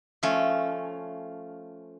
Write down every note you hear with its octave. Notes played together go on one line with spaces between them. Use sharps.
F3 A3 C#4